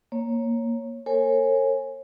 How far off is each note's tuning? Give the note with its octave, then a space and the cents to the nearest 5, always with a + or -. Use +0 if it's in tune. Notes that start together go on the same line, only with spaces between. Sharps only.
A#3 +0 C#5 -10
A#4 -45 C#5 -40 G#5 +0